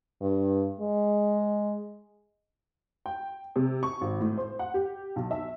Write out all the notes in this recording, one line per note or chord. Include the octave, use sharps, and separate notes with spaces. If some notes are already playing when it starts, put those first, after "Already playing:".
G2
G#3
G5
C3
C#6
G#1
A2
C5
F#5
G4
B1
E5